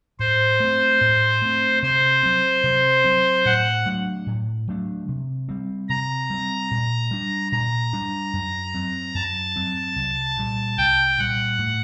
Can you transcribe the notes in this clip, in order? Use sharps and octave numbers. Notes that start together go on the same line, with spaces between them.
A2 C5
A3 C4
A2
A3 C4
C3 C5
F#3 C4
C3
F#3 C4
A2 F#5
F#3 A3 D4
A2
F#3 A3 D4
C3
G3 C4
C3 A#5
G3 C4
A#2
G3 D4
A#2 A#5
G3 D4
F#2
F#3 C4
F#2 A5
F#3 C4
C2
A#2 G3
C2 G5
A#2 G3 F#5
A2